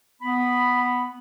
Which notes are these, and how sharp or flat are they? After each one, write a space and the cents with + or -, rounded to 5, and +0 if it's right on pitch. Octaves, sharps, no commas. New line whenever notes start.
B3 +0 B5 +0